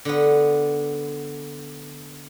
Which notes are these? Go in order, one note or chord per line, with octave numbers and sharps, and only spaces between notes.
D3 B3